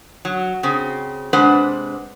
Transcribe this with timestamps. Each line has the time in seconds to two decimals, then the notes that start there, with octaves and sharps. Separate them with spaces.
0.25 F#3
0.63 C#3 C4
1.33 C3 G#3 D4 B4 C5 F#5